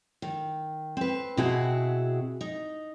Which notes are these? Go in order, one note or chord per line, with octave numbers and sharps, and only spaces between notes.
D#3
C4 B4
B2 C4 E4 F#4 G#4
D#4